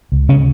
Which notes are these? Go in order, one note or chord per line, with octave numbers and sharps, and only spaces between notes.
C#2
C#3 C#4